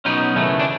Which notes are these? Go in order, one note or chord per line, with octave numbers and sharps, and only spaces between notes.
B2 F#3 B3 C#4 D#4
D#2 C#3 E3 A3
D4